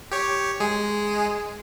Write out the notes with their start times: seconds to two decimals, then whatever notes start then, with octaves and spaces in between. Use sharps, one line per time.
0.12 G4 C#5
0.60 G#3 G#4